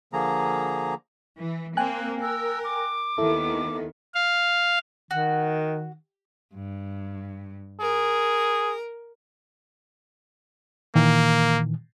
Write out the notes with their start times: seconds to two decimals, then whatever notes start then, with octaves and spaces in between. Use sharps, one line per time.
0.13 D3 F3 A#3 G#4 A#5
1.39 E3
1.77 A#3 C4 G5 G#5 F#6
2.22 A#4 E6
2.64 D6
3.18 D#2 D#3 B3 E4 A4
4.15 F5
5.11 D#3 F#4
6.54 G2
7.80 G#4 A#4
10.95 A#2 D#3 E3 A#3